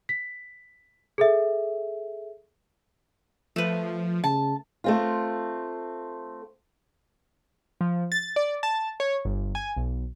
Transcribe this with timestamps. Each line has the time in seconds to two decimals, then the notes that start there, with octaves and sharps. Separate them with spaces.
0.09 B6
1.18 G#4 A4 E5
3.56 F3 A3 B4
4.24 C#3 A5
4.84 A3 C4 F4
7.81 F3
8.12 A6
8.36 D5
8.63 A5
9.00 C#5
9.25 G1
9.55 G#5
9.77 B1